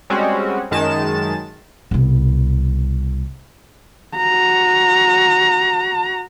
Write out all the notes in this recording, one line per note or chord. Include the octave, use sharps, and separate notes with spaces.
G3 G#3 C4 C#4 F#4
F#2 D#3 G#3 A5 E7
C2 B2
F#4 A#5